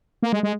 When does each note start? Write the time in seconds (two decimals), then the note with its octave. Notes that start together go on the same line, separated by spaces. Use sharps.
0.23 A#3
0.33 G#3
0.43 G#3